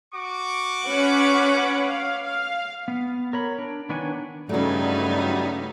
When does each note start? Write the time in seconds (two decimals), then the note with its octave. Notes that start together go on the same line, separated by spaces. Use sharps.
0.13 F#4 C#6 D6
0.83 C#4 B4 F#5
1.88 F5
2.23 F5
2.88 B3
3.33 A#4 C#5 B5
3.58 D4
3.89 D#3 B3 D4 C#5 G#5
4.49 G2 C#3 F#3 G3 A3 B3 D#4